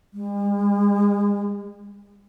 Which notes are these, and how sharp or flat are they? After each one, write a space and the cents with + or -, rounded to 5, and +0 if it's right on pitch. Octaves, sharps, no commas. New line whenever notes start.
G#3 -45